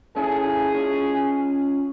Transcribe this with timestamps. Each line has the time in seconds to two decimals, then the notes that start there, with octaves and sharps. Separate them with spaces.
0.16 C#4 E4 G#4 A4
0.75 C#4 F4